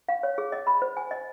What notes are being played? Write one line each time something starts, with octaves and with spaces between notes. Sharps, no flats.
F5
C#5
G#4
D#5
B5
C5
G#5
D#5